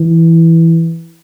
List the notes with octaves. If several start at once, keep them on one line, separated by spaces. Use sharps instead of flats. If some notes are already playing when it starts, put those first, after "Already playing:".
Already playing: E3